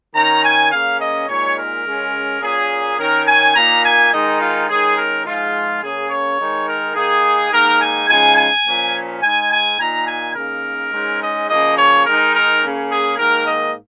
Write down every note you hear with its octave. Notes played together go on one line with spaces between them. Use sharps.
D#3 C#4 A#5
G#5
C#3 A#3 C#4 F5
D#5
A#2 G#3 D#4 C#5
A#4
C#3 G#3 C#4
A#2 A#3 C#4 G#4
D#3 C#4 A#4
G#5
A#2 A#3 D#4 A#5
G#5
D#3 G#3 D#4 D#5
F4
D#3 G#3 C#4 G#4
A#4
G#2 F3 G#3 F4
C#3 A#3 C#4 G#4
C#5
D#3 G#3 D#4
A#4
D#3 A#3 D#4 G#4
G#2 D#3 A#3 D#4 A#4
G#5
C#3 F3 G#3 D#4 G#5
G#5
A#2 F3 C#4
G#2 G#3 D#4 G#5
G#5
A#2 A#3 D#4 A#5
G#5
C#3 A#3 D#4 A#4
G#2 G#3 C#4
D#5
C#3 F3 A#3 D#5
C#5
D#3 G#3 D#4 A#4
A#4
C#3 A#3 C#4
G#4
G#2 D#3 A#3 A#4
D#5